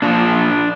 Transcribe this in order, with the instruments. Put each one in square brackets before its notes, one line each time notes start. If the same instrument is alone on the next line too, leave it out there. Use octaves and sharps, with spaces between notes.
[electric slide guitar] A#2 F3 D4